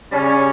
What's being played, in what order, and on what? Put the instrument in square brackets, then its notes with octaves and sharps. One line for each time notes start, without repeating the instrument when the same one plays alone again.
[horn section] C#3 G3 C#4